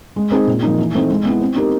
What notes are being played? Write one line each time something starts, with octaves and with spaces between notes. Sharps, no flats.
G#3
C4 D#4 G#4
A#2
F3 A#3 D#4
E3
A3 C4 D#4
G#3
B3 E4
C4
D#4 G4 A#4